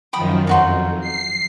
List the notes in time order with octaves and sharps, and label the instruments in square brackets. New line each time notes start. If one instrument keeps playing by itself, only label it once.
[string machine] F#2 D#3 F3 [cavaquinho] G5 B5 D#6
[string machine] F2 [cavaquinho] D#4 F#4 C6
[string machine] C7